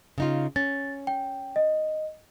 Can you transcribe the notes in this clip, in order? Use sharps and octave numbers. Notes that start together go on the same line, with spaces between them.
C#3 D#4 F4
C#4 A6
G5
D#5